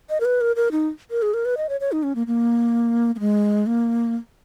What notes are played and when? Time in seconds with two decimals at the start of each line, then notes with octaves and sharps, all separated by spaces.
0.10 D#5
0.20 A#4
0.25 B4
0.41 A#4
0.56 A#4
0.72 D#4
1.11 A#4
1.22 G#4
1.34 A#4
1.45 B4
1.57 D#5
1.69 C#5
1.80 C#5
1.92 D#4
2.03 C#4
2.15 A#3
2.27 A#3
3.15 A#3
3.20 G#3
3.66 A#3